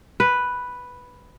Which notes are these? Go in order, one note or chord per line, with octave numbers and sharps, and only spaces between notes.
B4